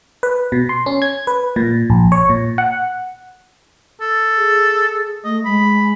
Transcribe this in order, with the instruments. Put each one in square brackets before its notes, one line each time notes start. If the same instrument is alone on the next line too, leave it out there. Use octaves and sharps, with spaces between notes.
[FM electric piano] B4
B2
C6
C#4
G#6
B4
A#2
A#1
C#5
A#2
F#5
[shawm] A4
[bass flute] G#4
[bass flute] A3 [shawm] D#5
[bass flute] G#3 [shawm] B5